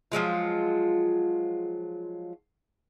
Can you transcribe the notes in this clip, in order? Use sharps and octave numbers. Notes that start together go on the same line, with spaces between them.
F3 F#3 G#3 F4